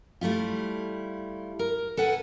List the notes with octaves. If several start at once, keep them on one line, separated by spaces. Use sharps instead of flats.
G3 A3 E4 F4
A#4
A4 B4 F#5 G#5